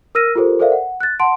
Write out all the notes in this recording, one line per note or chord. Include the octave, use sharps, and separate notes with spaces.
A#4 E6 F6 A#6 D#7
F4 G4 A4 A#4 C5
A4 A#4 C5 D5 E5 F5
F#5
F#6 A6
F#5 A5 C6 D7